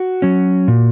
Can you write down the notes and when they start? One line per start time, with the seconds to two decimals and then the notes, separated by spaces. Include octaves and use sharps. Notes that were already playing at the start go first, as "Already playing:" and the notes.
Already playing: F#4
0.22 F#3 C#4
0.68 A#2